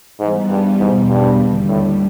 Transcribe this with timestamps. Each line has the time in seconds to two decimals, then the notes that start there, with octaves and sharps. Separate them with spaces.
0.20 G#2 E3 G3 B3
0.50 G2
0.80 E2 G#2 B2 G3
1.10 G2
1.39 D#2 D3 G3
1.69 A2